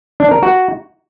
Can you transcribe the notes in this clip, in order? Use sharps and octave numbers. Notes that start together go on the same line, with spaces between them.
D4
A#4
F#4